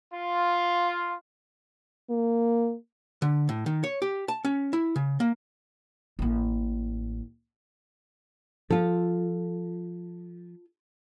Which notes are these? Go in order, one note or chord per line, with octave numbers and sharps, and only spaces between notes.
F4
A#3
D3
A2
D#3
C#5
G4
A5
C#4
E4
C#3
A#3
A1 A#3
F3 F4 A4